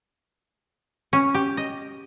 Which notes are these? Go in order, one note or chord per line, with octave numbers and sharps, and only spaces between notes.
C#4
G4
D#5